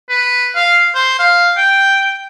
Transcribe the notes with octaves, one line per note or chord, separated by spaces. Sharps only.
B4
F5
C5
F5
G5